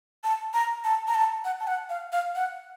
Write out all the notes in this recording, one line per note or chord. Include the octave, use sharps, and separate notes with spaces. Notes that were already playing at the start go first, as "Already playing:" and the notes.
A5
A#5
A5
A#5
A5
F#5
A5
F#5
F5
F5
F#5